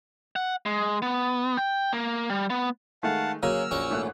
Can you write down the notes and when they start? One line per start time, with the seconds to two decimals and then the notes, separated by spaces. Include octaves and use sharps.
0.36 F#5
0.66 G#3
1.02 B3
1.57 G5
1.93 A#3
2.30 G3
2.50 B3
3.03 D#3 G#3 A3 F5 F#5 A5
3.43 C#3 F#3 A#3 G#5 E6 F6
3.71 A#1 C#4 C#6
3.90 G#1 A3 F#6